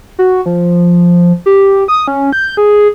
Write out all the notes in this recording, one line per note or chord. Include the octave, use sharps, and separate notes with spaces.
F#4
F3
G4
D#6
C#4
G6
G#4